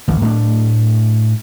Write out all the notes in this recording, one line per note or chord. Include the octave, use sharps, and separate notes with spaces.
A1 D2 E3
A2 A3 B3 D4